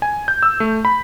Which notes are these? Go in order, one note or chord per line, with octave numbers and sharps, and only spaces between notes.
G#5
G6
E6
A3
B5